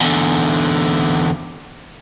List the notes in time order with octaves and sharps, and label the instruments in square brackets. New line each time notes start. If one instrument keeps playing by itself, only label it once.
[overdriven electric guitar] E2 D3